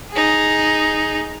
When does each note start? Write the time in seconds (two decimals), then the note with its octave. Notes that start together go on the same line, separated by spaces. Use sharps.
0.11 D#4 G#4